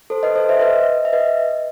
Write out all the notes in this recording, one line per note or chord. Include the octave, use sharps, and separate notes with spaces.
A4 C5
B4 D#5
A4 C5
C5 E5
B4 D#5
E5
B4 D#5